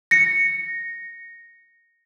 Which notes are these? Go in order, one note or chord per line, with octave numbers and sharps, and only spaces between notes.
A#6 C#7